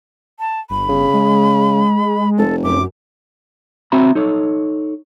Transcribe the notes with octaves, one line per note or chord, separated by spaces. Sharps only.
A5
G1 B5
C#3
G#3
F1 A4
F#2 D6
C4 F#4 E5 A#5 B5
D#4 A4 C#5